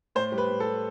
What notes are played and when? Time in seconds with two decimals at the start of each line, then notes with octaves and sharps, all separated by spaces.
0.15 A2 C5
0.32 G3
0.38 B4
0.49 A2
0.60 A4
0.66 G3